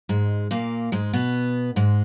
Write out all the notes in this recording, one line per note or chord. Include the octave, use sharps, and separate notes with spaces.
G#2 G#3
A#2 A#3
G#2 G#3
B2 B3
G#2 G#3